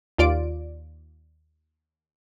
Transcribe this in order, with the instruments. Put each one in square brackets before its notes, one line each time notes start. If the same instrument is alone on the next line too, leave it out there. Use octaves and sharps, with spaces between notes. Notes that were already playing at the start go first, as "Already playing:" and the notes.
[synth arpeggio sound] D#2 F4 D5 D7